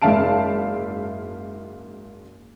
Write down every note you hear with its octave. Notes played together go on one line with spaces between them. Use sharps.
F#1 G#2 E5 F5 A5 D7